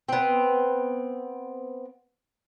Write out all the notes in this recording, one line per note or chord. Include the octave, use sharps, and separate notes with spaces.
B3 C4